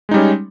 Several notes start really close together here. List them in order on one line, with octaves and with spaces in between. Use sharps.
G#3 D#4 G3 C#4